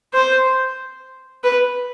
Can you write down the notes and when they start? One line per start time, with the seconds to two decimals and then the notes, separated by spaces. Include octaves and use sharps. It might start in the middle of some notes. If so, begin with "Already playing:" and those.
0.14 C5
1.44 B4